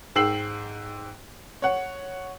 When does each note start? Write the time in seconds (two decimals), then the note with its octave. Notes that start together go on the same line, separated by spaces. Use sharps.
0.15 G#2 G5 E6 C7 F#7
1.62 C#5 F#5